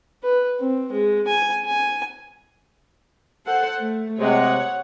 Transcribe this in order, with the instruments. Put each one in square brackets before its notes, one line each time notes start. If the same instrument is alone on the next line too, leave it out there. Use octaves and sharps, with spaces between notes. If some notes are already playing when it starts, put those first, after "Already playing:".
[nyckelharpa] B4
C4
G#3
G#5
G#5
[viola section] A4 C5 F#5
A3
[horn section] C3 G#3 [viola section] C#5 F#5